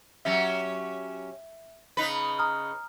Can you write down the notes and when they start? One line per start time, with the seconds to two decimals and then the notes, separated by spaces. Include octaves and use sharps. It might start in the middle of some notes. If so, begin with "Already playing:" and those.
0.25 F#3 C#4 G4 E5
1.97 C#3 D#4 B4
2.39 A#5 D#6 F6